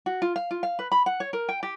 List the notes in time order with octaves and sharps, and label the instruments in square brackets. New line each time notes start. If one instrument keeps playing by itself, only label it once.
[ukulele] F#4
F4
F5
F4
F5
B4
B5
F#5
C#5
A#4
G5
G4